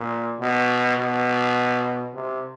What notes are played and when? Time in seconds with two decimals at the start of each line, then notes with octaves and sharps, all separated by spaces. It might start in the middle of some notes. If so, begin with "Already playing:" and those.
Already playing: A#2
0.40 B2
0.97 B2
2.14 C3